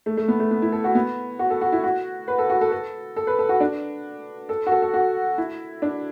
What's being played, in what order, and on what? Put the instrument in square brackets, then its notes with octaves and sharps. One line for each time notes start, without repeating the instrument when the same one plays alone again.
[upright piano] A3
A3
B3
A3
B3
E4
A4
F#4
B3
F#4
A4
F#4
E4
F#4
B4
A4
F#4
A4
A4
A4
B4
A4
F#4
D4
A4
F#4
A4
A4
F#4
E4
D4